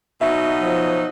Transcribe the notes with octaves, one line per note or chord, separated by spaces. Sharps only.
B2 F#3 D#4 E5
F3